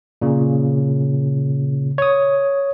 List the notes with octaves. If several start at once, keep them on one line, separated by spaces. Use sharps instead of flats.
A#2 C#3
C#5 D#6